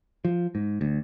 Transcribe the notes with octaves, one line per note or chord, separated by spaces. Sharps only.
F3
G#2
D2